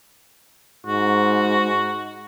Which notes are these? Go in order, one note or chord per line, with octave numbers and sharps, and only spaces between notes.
G#2 F#4